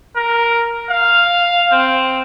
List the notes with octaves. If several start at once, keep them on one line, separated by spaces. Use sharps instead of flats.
A#4
F5
C4